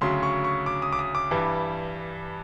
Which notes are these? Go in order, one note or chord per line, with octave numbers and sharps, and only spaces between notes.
D2 C#3 F#3 C6
C#6
C#6
D6
D#6
D6
D#6
D6
G2 E3 G3